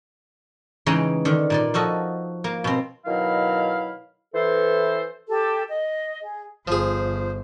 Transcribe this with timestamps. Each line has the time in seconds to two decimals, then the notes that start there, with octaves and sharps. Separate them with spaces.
0.86 C#3 E3 G#3 D#4 G5 A#5
1.25 D3 D#3
1.50 A#2 D#4 D5
1.74 F3 F#4 A4 D#5
2.44 A#3
2.64 B2 C4
3.06 B2 D#3 F#3 E4 F5
4.34 E3 A4 C5
5.28 G4 A4
5.69 D#5
6.21 G#4
6.68 G1 F3 G#4 C5